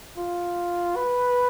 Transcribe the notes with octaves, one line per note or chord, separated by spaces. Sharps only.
F4
B4